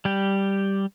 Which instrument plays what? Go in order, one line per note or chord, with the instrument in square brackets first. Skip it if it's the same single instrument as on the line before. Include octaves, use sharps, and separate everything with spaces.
[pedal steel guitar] G3 G4